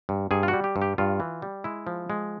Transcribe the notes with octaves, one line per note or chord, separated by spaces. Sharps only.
G2
G2 G#4
F4
F#4
G3
G4
G2
G4
G2 F4
E3
G3
G#3 E4
F3
G#3